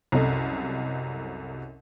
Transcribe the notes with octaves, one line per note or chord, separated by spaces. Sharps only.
C2 F#2 C3 A4 D#5